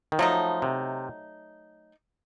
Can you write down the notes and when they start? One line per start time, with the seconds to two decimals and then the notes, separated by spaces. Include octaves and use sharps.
0.12 D#3
0.19 F3 F#3 A3 D#4
0.62 C3